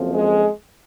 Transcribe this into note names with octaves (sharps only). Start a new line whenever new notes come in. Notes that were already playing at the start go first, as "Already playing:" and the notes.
Already playing: F#1 F2 F3
G#3